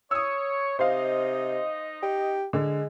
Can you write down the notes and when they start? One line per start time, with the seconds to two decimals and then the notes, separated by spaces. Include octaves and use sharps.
0.11 C#5 D#6 E6
0.79 C3 D#4 C5 D#5 F5
2.03 G4
2.53 D3 G#3